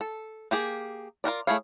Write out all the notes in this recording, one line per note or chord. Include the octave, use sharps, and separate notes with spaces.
A4
A#3 G4 G#4
F4 F#4 A#4 D5
A3 E4 G#4 C#5 F5